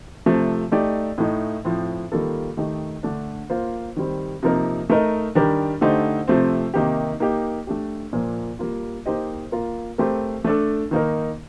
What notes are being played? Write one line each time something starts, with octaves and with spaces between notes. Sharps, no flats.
C3 F3 A3
A3 D#4 G4 D5
A2 A3 D#4
A2 F3 C4
D#3 G3 A#3 F4 A4
D#3 A3 D#4 G4
D3 A3 D4
A#3 F4 C5
D#3 G3 C4
C3 F3 A#3 D#4 A#4
A3 D#4 A#4 D#5
D#3 G3 D4 G4 A#4
D3 A3 D#4 G4 C5
C3 F3 A3 C4
C3 D#3 A#3 D#4 G4
A#3 D#4 G4
A3 D4 G4
A#2 F3 A#3
G3 A#3 F4
A#3 D#4 G4 C5 D#5
A#3 F4 A#4
A3 C4 G4 A#4
A3 D4 A4
D#3 A#3 D#4 A#4